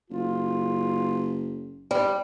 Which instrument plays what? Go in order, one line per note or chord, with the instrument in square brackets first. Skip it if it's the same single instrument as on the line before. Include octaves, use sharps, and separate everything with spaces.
[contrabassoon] F#1 [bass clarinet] F4
[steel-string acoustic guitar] G3